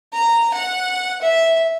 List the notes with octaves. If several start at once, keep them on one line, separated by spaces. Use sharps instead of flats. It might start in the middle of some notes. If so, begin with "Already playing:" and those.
A#5
F#5
E5